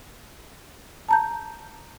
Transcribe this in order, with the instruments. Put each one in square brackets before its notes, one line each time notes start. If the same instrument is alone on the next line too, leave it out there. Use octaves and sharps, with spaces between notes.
[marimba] A5 A#5 G6